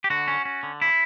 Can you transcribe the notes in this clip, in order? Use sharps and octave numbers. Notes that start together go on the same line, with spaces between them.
G4
D3 F#4
C#4
C#4
D3
E4